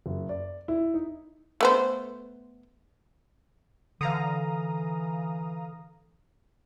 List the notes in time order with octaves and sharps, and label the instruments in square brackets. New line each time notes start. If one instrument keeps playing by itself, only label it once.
[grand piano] F#1
D5
E4
D#4
[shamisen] A3 B3 C5
[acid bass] D3 [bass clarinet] E3 [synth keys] F5 A#5 D#6